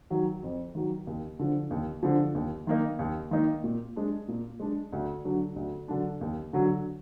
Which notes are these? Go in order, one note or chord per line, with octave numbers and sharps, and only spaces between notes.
D#3 F#3
F2
D#3 F#3
D#2
D3 F3
D#2
D3 F3
D#2
D#3 A#3 D#4
D#2
D#3 A#3 D#4
A#2
G#3 D4
A#2
G#3 D4
D2
D3 F#3 D4
D2
D3 F#3 D4
D#2
D3 F#3